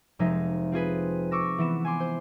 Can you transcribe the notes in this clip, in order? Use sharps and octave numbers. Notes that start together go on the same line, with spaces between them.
F1 F3 G#3 D#4 E5
C4 F4 G#4 B4
C#6 D6 E6 A#6
E3 B3 E7
G#5 C6 D6
C5